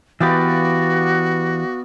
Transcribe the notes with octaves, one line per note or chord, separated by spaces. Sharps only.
E3 B3 F#4 G4 D5 F5